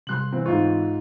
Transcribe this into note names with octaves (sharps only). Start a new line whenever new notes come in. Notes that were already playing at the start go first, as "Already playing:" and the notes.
C3 G3 C6 F#6 F#7
E3 C4
G#2 F4 C#6